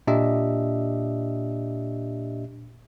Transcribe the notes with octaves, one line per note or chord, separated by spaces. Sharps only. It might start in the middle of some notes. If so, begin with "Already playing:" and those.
A#2 D4 G4 D#5 E5